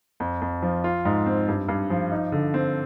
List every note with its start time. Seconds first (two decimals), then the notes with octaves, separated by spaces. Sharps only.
0.20 F2
0.42 F2
0.62 F3
0.84 F4
1.05 G#2
1.26 C4
1.48 G2
1.68 G2
1.90 F3
2.11 D#4
2.32 D3
2.54 C4